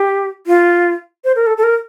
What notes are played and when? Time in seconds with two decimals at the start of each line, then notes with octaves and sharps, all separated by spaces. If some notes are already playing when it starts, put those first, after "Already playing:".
Already playing: G4
0.47 F4
1.24 C5
1.36 A#4
1.47 A4
1.57 A4
1.63 A#4